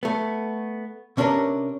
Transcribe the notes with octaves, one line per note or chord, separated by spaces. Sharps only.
A3 B3
C3 C#4 D4 G#4 A#4 B4